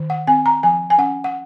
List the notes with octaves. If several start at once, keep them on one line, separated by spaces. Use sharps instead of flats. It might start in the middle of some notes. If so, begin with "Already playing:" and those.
Already playing: D#3
F#5
C4 G#5
A#5
F3 G#5
G#5
C#4 F#5
F#5